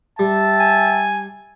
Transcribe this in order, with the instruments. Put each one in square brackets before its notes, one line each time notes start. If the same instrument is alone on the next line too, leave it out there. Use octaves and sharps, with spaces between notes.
[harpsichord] G3 [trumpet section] E5 G5 A5
[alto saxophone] G#5